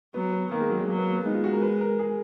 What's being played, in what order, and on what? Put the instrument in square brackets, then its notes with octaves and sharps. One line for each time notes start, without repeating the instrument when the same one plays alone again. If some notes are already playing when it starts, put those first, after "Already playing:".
[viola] F#3 [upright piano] B3
[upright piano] B3
[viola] D#3 [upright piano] A#3
[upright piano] G#3
F#3
G#3
[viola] F#3 [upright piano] A#3
[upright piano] B3
A#3
B3
[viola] G#3 [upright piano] D#4
[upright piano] F4
F#4
A#4
B4
A#4
G#4